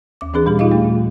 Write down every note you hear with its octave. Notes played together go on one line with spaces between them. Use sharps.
D#2 D6
E3 C4 D4 G#4 B4
A#2 G3 D4 G4
D#4 F4 D#5 F5
A3
A#2